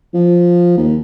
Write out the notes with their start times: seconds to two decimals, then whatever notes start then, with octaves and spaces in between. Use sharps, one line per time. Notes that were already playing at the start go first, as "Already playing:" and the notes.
0.14 F3
0.77 D#2